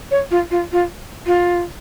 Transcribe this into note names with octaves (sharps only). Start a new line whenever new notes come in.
C#5
F4
F4
F4
F4